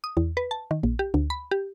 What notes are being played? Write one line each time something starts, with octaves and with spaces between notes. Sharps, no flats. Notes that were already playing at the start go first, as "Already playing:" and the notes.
D#6
E2
B4
A5
D#3
A#1
G4
D2
B5
G4